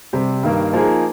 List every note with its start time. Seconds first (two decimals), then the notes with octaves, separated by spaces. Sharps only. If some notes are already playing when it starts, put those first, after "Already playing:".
0.13 C3 G3 C4 G4
0.43 G2 D#3 A#3
0.73 F3 A#3 D#4 G#4